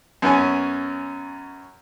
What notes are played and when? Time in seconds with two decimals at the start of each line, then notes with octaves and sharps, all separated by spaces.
0.22 F#2 B3 C#4 G#5